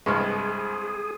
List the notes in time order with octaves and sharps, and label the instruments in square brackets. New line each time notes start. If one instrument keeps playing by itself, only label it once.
[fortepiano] C2 G2 G#3 [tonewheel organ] G#4 [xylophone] C#6 F6